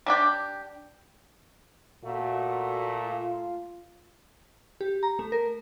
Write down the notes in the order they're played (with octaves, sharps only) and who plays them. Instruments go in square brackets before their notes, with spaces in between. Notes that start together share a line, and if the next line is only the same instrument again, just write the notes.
[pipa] G3 D4 G4
[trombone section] A#2 A3 [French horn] F#4
[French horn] F4
[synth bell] G4
A#5
A3
A#4